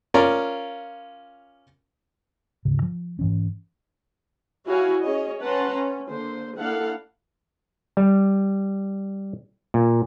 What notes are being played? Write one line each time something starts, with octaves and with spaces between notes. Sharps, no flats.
C#4 F4 A#4 D5
D2 G#2 C#3
F3
G#2 E3 C#4
E4 F#4 C#5 F5 G#5
C#4 G#4 C#5 D#5
C#4 B4 F#5 A5 A#5 C6
C#4
D3 A#3 C5
A#3 D4 E4 A4 F5 F#5
G3
A#2